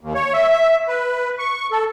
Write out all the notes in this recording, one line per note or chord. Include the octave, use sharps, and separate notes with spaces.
D#2
C#5
E5
B4
C#6
A4